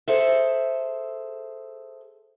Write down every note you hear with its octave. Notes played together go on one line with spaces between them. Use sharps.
G#4 A4 C5 E5